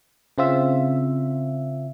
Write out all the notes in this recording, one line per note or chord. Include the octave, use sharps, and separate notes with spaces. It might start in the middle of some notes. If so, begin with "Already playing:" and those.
C#3 C4 F4 E5